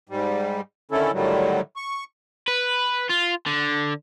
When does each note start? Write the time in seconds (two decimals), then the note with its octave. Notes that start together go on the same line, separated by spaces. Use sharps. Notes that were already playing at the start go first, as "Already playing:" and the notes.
0.09 G#2 G3
0.92 D3 D#3 C#4 E4 A4
1.13 A2 D3 D#3 F#3 G3
1.76 C#6
2.48 B4
3.10 F4
3.47 D3